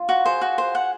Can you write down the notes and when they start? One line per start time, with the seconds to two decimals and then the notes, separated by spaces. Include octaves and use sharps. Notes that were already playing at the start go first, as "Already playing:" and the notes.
Already playing: F4
0.09 F#4
0.25 F4 G#4 C5
0.41 F#4
0.58 C5
0.75 F#5